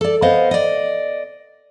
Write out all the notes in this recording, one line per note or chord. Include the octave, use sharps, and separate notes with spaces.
A4 D5
B3 C5 D#5 F5
D5 D#5